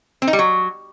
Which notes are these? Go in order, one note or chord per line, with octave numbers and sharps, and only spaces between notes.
C4
D#4
G3
F#3